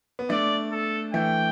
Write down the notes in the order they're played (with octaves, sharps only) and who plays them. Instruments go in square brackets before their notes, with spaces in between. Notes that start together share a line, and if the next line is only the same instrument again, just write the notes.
[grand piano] B3
[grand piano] A3 D4 [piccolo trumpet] D5
[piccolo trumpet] A4
[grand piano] E3 A3 [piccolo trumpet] G5